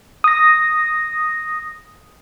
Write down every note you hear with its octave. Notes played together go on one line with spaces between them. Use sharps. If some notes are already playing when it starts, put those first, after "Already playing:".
D#6 A#6